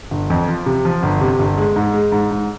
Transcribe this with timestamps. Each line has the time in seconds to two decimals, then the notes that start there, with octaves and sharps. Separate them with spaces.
0.11 G1
0.30 F2
0.48 F3
0.66 C3
0.85 F3
1.03 G1
1.21 C3
1.39 G1
1.57 G#3
1.76 G#2
1.94 G#3
2.12 G#2
2.31 G#2